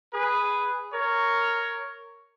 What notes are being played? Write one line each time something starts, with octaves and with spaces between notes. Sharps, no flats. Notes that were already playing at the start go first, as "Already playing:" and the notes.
G#4 B4
A#4 C#5